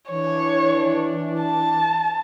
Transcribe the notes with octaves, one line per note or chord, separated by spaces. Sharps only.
E3 D4 C#5
A5